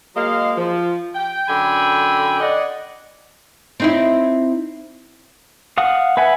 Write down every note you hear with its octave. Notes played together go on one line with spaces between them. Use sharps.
F#3 G#3 A#3 D#5 F5
F3
G5
F#2 D3 G5 G#5 B5
D5 D#5 F#5
C4 D#4 E4
F5 F#5 D#6
B4 E5 F#5 G#5 B5